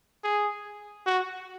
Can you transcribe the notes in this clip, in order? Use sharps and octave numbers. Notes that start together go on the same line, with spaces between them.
G#4
F#4